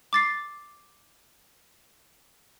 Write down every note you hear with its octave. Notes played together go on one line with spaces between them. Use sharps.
D6 A6 C7